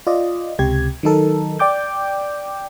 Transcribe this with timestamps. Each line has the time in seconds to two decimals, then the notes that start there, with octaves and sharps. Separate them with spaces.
0.07 F4 D5 D#5
0.59 C#2 C3 G4 G#6
1.03 D#3 F#3 D#4 A4 A#4
1.59 D5 G5 D6 G6